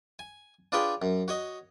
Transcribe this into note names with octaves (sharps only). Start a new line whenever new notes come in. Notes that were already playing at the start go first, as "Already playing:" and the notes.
G#5
D4 F4 G#4 B4 C#5 G5
F#2
F#4 C#5 D#5